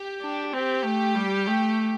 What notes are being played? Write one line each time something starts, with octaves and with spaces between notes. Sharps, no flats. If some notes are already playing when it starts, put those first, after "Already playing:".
Already playing: G4
D4
C4 G4
A3
G3
A3